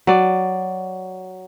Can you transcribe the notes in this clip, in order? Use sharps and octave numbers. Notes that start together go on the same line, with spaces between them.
F#3 D5